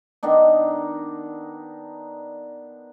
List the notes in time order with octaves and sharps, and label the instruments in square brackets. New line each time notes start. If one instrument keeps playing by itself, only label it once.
[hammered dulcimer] D#3 B3 D4 D#4